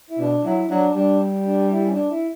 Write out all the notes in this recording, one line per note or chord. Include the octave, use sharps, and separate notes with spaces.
E4
B2 D4
F#3 E4
F#3 D4
G3 D4
D4
E4
C#4
D4
E4